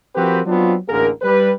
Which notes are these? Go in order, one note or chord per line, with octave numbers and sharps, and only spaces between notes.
F3 C4 F#4 G4 A#4 B4
F#3 B3 C4 D4 F4
A1 D2 D3 A#3 G#4 A#4
G3 B4